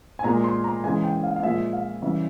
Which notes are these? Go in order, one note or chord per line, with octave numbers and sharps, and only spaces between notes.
G#5
A#2 G#3 A#5
C6
A#5
C#3 E3 G#3 G#5
G5
F5
F5
A#2 F3 G#3 E5
F5
C#3 E3 G3 E5